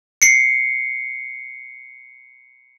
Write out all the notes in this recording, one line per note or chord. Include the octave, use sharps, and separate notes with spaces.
C7 C#7